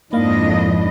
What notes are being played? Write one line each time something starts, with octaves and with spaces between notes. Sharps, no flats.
F2 G#2 G#3 A#3 D4 E4 D#5 F5